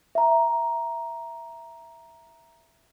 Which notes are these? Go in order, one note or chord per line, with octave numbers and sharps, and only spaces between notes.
E5 A#5